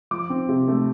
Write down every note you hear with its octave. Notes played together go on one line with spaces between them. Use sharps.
F3 D6
C4
C3
A3